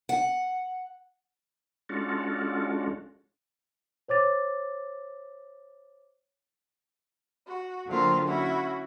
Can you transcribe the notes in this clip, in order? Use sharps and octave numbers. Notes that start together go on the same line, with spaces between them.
F#5
G#3 C#4 D4 F4 F#4 A4
C5 C#5 D6 A6
F#4
D3 F#3 A#3 C4 F4 A#4
C#4 E4 F#4